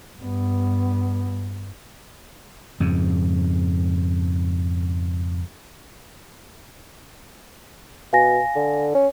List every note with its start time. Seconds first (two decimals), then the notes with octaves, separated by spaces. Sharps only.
0.19 G2 B3
2.80 F2 G#2 C#3
8.13 B2 F5 G#5 A#6
8.56 D3
8.95 C#4